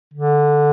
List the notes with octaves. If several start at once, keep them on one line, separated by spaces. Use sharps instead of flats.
D3